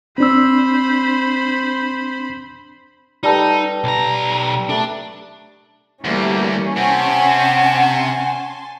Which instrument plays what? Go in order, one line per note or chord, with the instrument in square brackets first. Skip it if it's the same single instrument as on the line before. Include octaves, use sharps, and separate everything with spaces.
[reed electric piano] C4 D4 E6 [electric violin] C5 B5
[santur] G3 A4 B4 [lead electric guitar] D#4
[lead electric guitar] B1 A#5
[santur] A3 [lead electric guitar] D4
[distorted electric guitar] D2 [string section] E3 G3 A#3 [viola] C#4
[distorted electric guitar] C3 C4 [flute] F#5 [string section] G#5 A5 C6